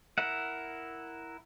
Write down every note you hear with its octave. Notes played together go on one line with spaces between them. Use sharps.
E4 A#4 E5 F#5